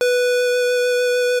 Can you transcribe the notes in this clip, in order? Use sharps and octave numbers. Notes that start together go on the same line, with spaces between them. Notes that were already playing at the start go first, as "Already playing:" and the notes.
B4